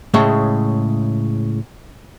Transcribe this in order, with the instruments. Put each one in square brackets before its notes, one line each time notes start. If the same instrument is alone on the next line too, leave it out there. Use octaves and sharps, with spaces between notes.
[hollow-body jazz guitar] A2 C#3 G#3